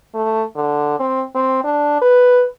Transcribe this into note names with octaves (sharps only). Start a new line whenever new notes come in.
A3
D3
C4
C4
D4
B4